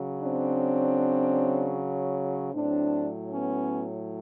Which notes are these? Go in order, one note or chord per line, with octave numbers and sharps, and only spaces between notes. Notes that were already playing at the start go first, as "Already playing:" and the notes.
Already playing: C#3 F#3
C4 D4
A2 F#3 C4 D4
B3 C#4